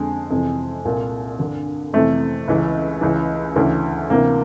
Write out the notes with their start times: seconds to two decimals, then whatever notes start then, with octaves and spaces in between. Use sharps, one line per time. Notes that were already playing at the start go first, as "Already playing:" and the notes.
Already playing: F2 D3 G#3
0.30 F2 C3 E3
0.85 C2 A#2
1.38 G2 D3
1.93 F2 C3 E3 A3
2.48 C#2 C#3 E3
3.01 C#2 C#3 E3
3.56 D2 C#3 E3
4.10 D2 C3 E3 A#3